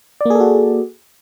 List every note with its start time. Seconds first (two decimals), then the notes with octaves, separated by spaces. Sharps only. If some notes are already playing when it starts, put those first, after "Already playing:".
0.21 D5
0.25 A#3
0.30 G#4
0.35 A4
0.40 F#4